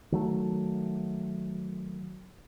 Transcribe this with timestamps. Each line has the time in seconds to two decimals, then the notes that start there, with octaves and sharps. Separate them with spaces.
0.12 D#3 F#3 A3